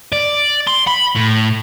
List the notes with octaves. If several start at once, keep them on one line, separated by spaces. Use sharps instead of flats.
D5
C6
B5
A2